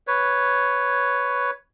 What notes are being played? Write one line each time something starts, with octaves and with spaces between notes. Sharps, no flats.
B4 C#5